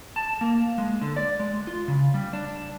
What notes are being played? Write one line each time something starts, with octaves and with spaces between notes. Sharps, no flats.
A5
A#3
G#3
D3
D5
G#3
F4
C#3
G3
D4